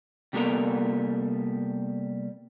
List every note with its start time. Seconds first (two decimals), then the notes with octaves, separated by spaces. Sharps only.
0.33 C3 G3 A#3 B3 A4 A#4